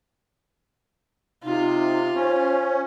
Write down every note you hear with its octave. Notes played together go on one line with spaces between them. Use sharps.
C3 D#4 F4
C#4 C5